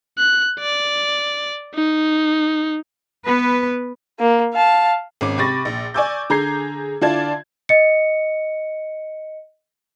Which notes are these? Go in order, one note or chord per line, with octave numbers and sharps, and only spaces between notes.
F#6
D5
D#4
B3 B4
A#3
F5 A5
G#1 C#4 D6
C3 G4 B5 C#6 A6 A#6
A#1
D5 G#5 C#6 D6 E6 G6
D3 G#4 A#5 G6 G#6 C7
D3 E4 F4 D5 A5 G#6
D#5 C#7